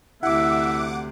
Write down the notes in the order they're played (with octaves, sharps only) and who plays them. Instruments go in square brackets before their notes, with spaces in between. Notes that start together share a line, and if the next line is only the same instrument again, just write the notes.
[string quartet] D2 C3 [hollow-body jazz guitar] E4 [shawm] E5 [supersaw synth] F#5 D6